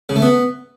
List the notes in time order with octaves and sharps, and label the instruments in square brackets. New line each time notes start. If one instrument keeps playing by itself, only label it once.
[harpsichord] C#3
A3
B3